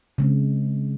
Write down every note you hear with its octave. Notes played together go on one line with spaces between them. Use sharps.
C#3 G#3 C4